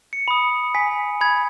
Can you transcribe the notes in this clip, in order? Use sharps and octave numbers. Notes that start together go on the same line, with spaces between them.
C#7
B5 D#6
G#5 B6
B5 D#6 G#6